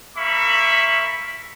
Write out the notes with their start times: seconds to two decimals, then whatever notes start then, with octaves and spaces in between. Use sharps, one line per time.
0.16 A#3 E5 B5 C#6